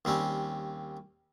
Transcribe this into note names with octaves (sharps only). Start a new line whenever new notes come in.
D#2 G3 C4 C#4